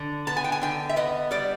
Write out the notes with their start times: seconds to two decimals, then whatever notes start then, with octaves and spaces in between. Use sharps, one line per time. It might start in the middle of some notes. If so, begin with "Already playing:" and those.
Already playing: D3
0.27 B3 A5
0.37 G#5
0.44 G5
0.52 G#5
0.62 D3 G5
0.89 E5
0.96 B3 D#5
1.31 G3 D5